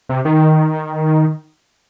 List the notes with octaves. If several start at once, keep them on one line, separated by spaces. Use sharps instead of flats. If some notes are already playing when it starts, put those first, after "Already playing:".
C3
D#3